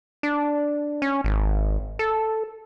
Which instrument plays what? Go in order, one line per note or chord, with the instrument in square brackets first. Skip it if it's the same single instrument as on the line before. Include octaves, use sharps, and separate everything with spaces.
[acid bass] D4
C#4
G#1
A4